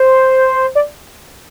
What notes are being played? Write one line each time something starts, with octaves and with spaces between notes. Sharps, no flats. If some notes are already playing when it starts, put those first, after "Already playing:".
Already playing: C5
D5